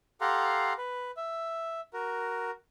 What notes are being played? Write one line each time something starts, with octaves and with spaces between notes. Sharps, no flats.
G4 A4 F5 F#5 A#5 C6
B4
E5
F#4 A#4